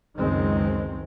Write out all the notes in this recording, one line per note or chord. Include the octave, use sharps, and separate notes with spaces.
C#2 F#2 D#3 G#3 C4